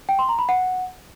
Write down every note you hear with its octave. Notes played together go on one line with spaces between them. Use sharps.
G5
C6
A#5
B5
F#5